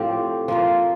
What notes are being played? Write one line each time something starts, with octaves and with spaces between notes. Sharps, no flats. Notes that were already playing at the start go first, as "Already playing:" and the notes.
Already playing: A2 F3 C4 G4
F3 A#3 F4